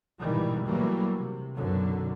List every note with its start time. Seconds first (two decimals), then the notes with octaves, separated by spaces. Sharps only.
0.20 A#1 G#2 B2 D#3 E3 G3
0.66 E3 F#3 G3 A3 A#3
1.16 C3
1.55 B1 F#2 B2 D3 F#3